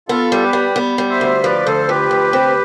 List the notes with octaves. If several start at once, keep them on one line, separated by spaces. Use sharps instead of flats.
B3 F4 A4
G3
G4 B4
G3
B3
G3
C5 E5
D2
F3 B4 D5
D2 A4 C5
F3 G4 B4
D2
C4